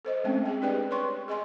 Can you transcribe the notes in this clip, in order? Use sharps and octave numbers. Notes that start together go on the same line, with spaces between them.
A4 C5 D#5
G#3 A3 C4 C#4 G5
G#4 G5
D4 G4 B4 D5 G5
B4 C#5 C6 C#6
G#4 D#5 G#5 C6